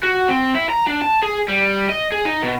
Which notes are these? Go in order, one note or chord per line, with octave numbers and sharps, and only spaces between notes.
F#4
C4
E4
A#5
D4
A5
G#4
G3
D#5
G#4
D#4
B2